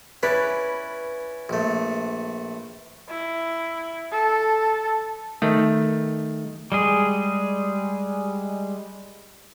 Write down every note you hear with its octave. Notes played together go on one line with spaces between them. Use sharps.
C#4 E4 B4 D5
A#1 A3
E4
A4
D#3 A3
G3 G#3 G#4